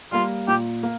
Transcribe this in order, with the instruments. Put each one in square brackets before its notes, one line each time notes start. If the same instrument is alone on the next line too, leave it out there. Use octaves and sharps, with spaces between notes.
[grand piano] G3 A#3 [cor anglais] F4
[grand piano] A#2 [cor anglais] G4
[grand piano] A#3